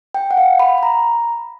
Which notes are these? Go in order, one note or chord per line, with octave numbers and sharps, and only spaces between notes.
G5
F#5
F5
B5
B5
A#5